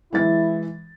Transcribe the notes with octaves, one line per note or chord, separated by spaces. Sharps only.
E3 G#3 E4 A6